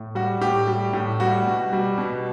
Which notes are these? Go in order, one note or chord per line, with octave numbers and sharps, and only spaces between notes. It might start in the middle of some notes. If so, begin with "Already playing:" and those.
Already playing: A2
G3 F#4
A2 G4
G3
A2
G3 F#4
B2
G3
B2